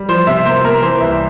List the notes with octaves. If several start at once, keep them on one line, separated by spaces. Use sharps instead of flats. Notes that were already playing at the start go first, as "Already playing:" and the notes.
Already playing: G3
F3 C5
C3 E5
A#3 C5
A#3 A#4
E3 C5
C2 E5